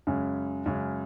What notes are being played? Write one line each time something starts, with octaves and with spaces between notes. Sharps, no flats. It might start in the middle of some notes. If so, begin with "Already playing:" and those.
F#2 C#3 G#3
F#2 C#3 G#3